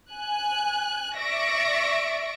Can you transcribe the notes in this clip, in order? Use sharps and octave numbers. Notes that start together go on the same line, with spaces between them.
G#5 F#6
D5 E5 C#6 A#6 D7